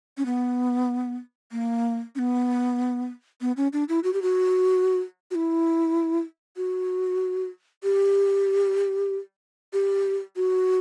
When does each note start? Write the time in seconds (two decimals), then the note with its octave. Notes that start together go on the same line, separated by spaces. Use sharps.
0.17 C#4
0.26 B3
1.52 A#3
2.15 C#4
2.19 B3
3.41 B3
3.57 C#4
3.73 D4
3.89 E4
4.04 F#4
4.13 G4
4.22 F#4
5.31 F#4
5.35 E4
6.57 F#4
7.83 G4
9.73 G4
10.36 F#4